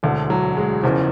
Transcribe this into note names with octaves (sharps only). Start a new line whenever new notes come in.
E1 D2 D3
F#3
G#3
F#1 E2 C#3 E3 F3